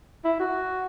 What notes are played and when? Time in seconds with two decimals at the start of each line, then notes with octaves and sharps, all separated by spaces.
0.24 E4
0.40 F#4